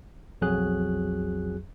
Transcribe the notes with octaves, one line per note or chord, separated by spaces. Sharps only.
B1 F2 F#3 F#4 G#4 F#6